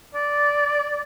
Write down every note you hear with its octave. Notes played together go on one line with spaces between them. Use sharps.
D5